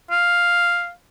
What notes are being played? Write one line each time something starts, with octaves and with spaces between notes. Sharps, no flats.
F5